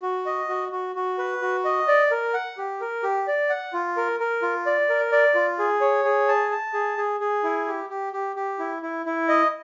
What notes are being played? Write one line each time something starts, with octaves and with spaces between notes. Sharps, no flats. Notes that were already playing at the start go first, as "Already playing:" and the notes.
F#4
D#5
F#4
F#4
F#4
B4
F#4
D#5
D5
A#4
F#5
G4
A#4
G4
D5
F#5
F4
A#4
A#4
F4
D5
A#4
D5
F4
G#4
C#5
G#4
A5
A5
G#4
G#4
G#4
E4
G4
G4
G4
G4
E4
E4
E4
D#5